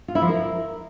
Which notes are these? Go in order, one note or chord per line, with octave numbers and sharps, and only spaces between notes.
F4
E4
F3
A#4